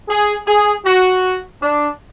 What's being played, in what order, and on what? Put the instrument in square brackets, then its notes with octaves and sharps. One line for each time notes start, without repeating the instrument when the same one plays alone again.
[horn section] G#4
G#4
F#4
D4